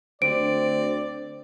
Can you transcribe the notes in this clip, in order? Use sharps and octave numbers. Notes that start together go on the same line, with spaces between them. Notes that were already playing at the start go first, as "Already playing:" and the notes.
D2 C4 D5 D7